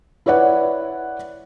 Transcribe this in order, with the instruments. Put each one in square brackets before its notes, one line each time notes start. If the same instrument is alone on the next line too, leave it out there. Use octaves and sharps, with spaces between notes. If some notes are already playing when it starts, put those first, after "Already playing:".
[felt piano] E4 B4 C#5 D5 F#5